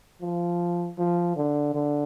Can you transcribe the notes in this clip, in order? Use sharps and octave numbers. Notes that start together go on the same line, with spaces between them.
F3
F3
D3
D3